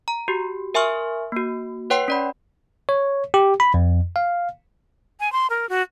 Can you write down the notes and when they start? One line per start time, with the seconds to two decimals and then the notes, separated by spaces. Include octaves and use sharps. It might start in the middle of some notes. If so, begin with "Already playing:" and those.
0.08 A#5
0.28 F#4 G4
0.74 A#4 E5 G#5 C6 C#6 F6
1.32 A#3 F#4
1.90 B4 C#5 F#5 G5 C6 C7
2.08 C#4 D5 B5
2.89 C#5
3.34 G4
3.60 B5
3.74 F2
4.16 F5
5.20 G#5
5.32 C6
5.50 A#4
5.69 F#4